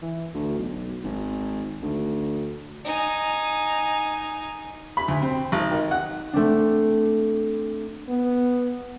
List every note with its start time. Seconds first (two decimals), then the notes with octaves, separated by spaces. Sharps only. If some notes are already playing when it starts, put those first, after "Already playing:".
0.02 E3
0.34 D2
0.59 B1
1.04 G#1
1.82 D2
2.84 D#4 G#5
4.97 B5
5.08 D2
5.22 C4
5.52 G#1
5.71 D#3
5.91 F#5
6.33 A3 C4 D4
8.09 B3